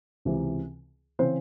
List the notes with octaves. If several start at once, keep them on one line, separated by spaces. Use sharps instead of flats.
C#2 C3 E3
C#3 E3 C4 C5